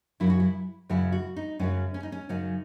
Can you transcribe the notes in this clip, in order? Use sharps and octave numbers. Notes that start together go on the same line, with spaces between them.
F#2 C#3 F#3 E4
F#4
E4
F#2 C#3 F#3 E4
F#4
D#4
F#2 C#3 F#3 C#4
C#4
D#4
C#4
F#2 C#3 F#3 D#4